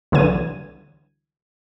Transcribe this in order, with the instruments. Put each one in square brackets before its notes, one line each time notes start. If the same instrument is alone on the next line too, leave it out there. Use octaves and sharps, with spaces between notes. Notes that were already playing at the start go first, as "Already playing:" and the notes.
[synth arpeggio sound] C2 D3 E3 F#3 G#6 D#7